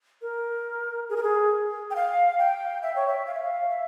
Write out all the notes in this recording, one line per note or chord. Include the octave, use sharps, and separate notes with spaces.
A#4
G#4
A#4
G#4
G5
F5
G5
E5
C#5
E5
F5
E5
F5
E5